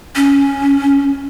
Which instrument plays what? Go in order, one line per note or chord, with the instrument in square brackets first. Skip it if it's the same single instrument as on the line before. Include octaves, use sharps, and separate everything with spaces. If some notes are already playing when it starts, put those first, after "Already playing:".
[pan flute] C#4